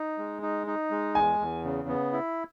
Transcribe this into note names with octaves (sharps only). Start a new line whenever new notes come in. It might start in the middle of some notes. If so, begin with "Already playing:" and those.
Already playing: D#4
G#3
D#4
D#4
G#3
E2 G#5
E2
C#3
B3
E4